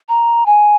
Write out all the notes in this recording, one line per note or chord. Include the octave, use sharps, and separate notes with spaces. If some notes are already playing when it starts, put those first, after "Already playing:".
A#5
G#5